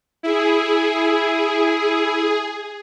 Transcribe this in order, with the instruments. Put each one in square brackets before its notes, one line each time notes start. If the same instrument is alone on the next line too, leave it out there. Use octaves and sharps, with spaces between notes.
[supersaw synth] E4 [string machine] G#4